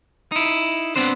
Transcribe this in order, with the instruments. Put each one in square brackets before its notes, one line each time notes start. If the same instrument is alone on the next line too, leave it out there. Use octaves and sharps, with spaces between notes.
[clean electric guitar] D#4 E4
B3 C4 D4 C5